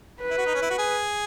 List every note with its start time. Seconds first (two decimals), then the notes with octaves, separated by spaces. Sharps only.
0.22 B4
0.30 E4
0.38 F#4
0.46 D#4
0.54 C#4
0.62 E4
0.70 F#4
0.78 G#4